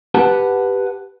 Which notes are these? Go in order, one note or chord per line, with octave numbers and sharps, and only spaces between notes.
G4 B4 F#5 A5